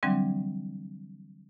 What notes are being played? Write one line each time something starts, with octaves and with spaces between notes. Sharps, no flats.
D3 E3 F#3 G3 C4 D4